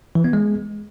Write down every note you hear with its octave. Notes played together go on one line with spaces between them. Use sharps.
E3
B3
G#3